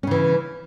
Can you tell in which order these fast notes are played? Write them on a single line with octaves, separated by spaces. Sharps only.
C#4 C#3 E3